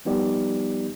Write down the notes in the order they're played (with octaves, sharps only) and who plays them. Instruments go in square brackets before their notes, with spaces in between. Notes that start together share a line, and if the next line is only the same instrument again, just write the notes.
[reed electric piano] F3 G3 B3 D#4 G4 D5